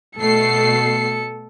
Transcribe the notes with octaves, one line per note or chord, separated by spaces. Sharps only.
B2 A3 A4 C7 C#7